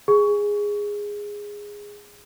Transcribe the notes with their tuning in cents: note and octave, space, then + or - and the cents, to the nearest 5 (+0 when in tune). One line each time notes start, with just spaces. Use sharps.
G#4 -10